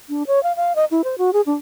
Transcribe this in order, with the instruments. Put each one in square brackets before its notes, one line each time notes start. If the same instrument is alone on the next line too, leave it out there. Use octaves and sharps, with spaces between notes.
[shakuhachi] D4
C#5
F5
F5
D#5
E4
C5
F#4
G#4
D4